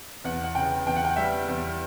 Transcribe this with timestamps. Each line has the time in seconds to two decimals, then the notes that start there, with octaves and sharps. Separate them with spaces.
0.24 E2 F#5
0.44 F#5
0.55 C#3 G5
0.86 E2 G5
0.96 F#5
1.05 G5
1.16 G3 E5
1.48 E2